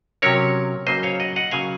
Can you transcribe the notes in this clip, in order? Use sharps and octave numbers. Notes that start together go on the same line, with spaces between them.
C3 F#3 C#4 A#4 C#5
C#3 F#3 A#3 C5 D#5
C#5 F5
D#5 F#5
D#5 F#5
C#3 F#3 A#3 F5 G#5